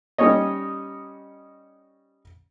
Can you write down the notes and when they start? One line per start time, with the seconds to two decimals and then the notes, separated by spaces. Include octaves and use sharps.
0.18 G3 C#4 D#4 C#5 D#5